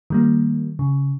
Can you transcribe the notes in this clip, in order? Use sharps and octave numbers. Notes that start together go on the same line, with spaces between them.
D#3 G3 A#3
C#3